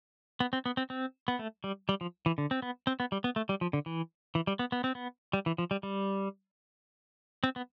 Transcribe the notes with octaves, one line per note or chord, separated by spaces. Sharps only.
B3
C4
B3
C4
C4
B3
A3
G3
G3
F3
E3
D3
C4
B3
C4
B3
G3
B3
A3
G3
F3
D3
E3
E3
G3
B3
B3
C4
B3
G3
E3
F3
G3
G3
C4
B3